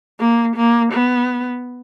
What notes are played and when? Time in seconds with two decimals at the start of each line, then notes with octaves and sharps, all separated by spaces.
0.20 A#3
0.56 A#3
0.93 B3